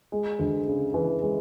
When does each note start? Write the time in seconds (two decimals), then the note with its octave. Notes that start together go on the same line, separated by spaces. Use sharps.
0.12 G#3
0.39 D2
0.67 C#3
0.94 E3
1.22 G#3